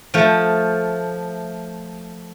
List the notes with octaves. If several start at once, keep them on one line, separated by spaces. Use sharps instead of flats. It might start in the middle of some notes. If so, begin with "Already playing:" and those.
F3 A3